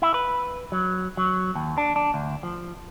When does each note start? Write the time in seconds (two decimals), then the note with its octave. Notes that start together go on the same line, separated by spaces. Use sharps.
0.02 E4
0.14 B4
0.72 F#3
1.17 F#3
1.55 D#2
1.78 D4
1.96 D4
2.14 D2
2.43 F3